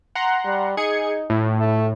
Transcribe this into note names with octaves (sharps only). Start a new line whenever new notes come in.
F#5 A#5 C6
G3
D#4 G#4 G#6 C#7
A2
A3